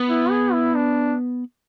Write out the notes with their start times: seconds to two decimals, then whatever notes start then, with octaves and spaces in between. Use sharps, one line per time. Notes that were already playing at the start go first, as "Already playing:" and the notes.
Already playing: B3
0.09 E4
0.31 G#4
0.53 E4
0.74 D4